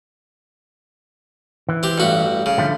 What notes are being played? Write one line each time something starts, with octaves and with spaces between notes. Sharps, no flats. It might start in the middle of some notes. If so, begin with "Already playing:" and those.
E3
C4 G4
A1 G2 F#4
C#3
D3 F3 A3